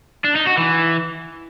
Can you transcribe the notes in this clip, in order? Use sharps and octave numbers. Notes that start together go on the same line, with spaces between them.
D4
D#4
F#4
E3